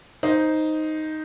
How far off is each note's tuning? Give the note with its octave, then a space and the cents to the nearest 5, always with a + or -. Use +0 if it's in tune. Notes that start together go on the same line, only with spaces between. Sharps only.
D#4 +0 C5 +0